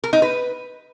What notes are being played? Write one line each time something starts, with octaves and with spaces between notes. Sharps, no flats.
A#4
D#4
B4